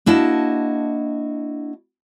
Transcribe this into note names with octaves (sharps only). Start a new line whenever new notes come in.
A#3 D4 E4 F#4 D#5 A5